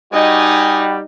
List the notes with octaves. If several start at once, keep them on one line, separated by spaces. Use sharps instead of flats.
G3 D#4 F#4 D#5 G#5